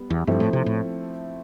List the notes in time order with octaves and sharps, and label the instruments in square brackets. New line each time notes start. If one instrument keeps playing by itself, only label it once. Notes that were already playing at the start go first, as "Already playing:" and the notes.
Already playing: [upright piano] G3 B3
[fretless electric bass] E2
[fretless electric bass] G2 [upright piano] F3 A3 C4 E4
[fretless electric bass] A2
C3
A2